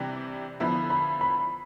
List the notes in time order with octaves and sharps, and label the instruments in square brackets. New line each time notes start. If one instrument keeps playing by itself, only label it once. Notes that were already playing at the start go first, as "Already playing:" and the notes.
Already playing: [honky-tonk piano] C3 E3 G3 D4 G4
[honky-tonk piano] D3 F3 B3 E4 [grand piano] B5
[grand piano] B5
B5